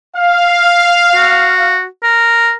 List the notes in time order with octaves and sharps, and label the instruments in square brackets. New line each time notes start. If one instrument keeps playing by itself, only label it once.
[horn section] F5
[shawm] F#4
A#4